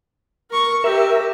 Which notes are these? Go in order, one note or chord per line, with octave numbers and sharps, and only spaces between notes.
A#4 C#6
G4 A#4 E5